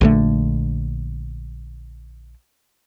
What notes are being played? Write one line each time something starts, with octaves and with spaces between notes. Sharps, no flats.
A#1 D3 A3